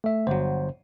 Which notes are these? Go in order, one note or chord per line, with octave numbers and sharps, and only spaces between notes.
A3 E5
G1 F#3 C5